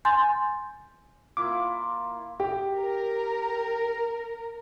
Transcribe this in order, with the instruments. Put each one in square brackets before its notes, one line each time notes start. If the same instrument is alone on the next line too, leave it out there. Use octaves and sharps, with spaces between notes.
[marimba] G#5 C6 G6 A6
[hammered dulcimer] A#3 E4 F4 [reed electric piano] D6
[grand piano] G4
[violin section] A#4